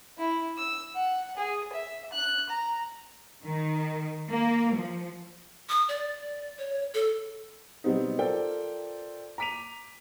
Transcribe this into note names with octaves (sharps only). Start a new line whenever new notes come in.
E4
E6
F#5
G#4
E5
F#6
A#5
D#3
A#3
F3
D#6
D5
C#5
A4
B2 F#3 G3 B3 C4 D#4
F4 A4 A#4 C5 D5 G5
A#5 D6 B6 D7 D#7 F7